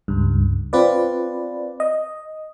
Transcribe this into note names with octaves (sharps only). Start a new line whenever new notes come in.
C#2 G2
C4 F4 B4 D5
D#5